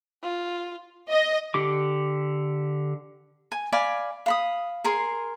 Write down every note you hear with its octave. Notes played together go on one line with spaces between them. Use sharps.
F4
D#5
D3 G4 D6
G#5
D5 F5 G#5 B5
F5 B5 D#6
G#4 A#4 C6